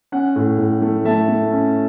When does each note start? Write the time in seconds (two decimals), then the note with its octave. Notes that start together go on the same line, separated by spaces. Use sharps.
0.12 C#4 F#5
0.36 A2
0.58 A2
0.82 A3
1.04 A3 E5 A5
1.28 A3
1.52 C#4